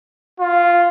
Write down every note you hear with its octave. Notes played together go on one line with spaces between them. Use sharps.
F4